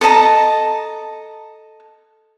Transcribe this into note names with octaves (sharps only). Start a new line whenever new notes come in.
A4 D#5 A5 A#5